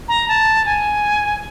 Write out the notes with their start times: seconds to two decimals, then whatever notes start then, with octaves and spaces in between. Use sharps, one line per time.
0.08 A#5
0.28 A5
0.66 G#5